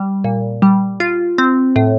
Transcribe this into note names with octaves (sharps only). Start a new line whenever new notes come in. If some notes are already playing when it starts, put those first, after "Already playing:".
Already playing: G3
A#2
G3
F4
C4
A2